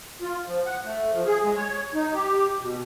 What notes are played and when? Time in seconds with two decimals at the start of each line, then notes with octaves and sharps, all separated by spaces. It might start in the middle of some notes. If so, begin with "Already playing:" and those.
0.21 F4
0.47 F3
0.66 F#5
0.85 A3
1.13 F3
1.26 G#4
1.44 G#3
1.56 C#5
1.94 D#4
2.14 G4
2.61 B2